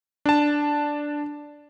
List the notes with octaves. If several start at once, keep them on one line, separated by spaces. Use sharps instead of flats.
D4 A5